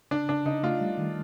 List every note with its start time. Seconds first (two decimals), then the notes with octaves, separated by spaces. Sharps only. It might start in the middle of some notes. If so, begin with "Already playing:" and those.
0.11 C#3 D4
0.29 C#3 D4
0.46 C#3 D#4
0.63 A3 F4
0.80 G3
0.98 D#3